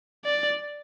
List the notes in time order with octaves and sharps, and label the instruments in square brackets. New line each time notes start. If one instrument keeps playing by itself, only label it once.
[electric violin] D5